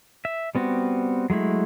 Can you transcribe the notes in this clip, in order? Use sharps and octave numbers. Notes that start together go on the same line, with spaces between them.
E5
G3 B3 C4 F#4
F#3 G#3 A3 E4